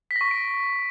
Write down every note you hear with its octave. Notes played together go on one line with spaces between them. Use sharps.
B6
A#6
C#6
B6
D7